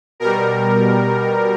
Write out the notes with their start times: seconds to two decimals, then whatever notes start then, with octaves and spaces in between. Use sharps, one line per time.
0.20 B2 G3 A#4